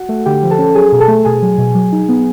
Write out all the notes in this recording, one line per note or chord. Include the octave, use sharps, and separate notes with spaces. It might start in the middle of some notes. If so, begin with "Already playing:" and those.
Already playing: F#4 F#5
A3
D3 G4 G5
F3
A4 A5
C#4
F#3 G#4 G#5
B2
A4 A5
A3
B2 G#4 G#5
F#3
B2
F#3
D#4
B3